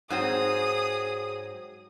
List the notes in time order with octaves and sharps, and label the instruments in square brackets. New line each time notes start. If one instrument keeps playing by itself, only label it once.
[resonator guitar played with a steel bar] G#2 F#3 C4 [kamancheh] G#4 D#6